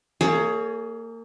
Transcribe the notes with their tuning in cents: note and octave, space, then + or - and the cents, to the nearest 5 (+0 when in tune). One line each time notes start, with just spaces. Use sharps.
A#3 -30 G#4 +15 C#5 +20